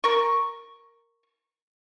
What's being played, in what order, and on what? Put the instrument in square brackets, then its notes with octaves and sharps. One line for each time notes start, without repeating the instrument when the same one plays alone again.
[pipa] A#4 C#6